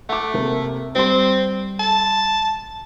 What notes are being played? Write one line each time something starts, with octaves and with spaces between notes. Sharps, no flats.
A3 F#5 D6
C3 A#3
G3 C4 C6
A5